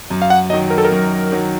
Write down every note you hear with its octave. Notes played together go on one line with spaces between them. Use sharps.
F#2
F5
F#5
D#3 F#3 D#5
A#4
A4
A#4
F#2
D#3 F#3